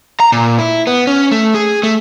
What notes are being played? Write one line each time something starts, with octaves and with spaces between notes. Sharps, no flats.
A#5
A#2
E4
B3
C#4
A3
G#4
A3